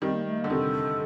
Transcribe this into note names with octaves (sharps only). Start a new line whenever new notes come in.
D#3 G3 C4
A#3
A3
A#3
D3
C3 D#3 A4